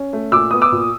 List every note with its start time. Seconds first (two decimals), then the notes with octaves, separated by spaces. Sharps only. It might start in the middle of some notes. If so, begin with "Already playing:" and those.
Already playing: C#4
0.13 A3
0.32 A#2 D6 E6
0.51 B3 D#6
0.62 D6 E6
0.72 A#2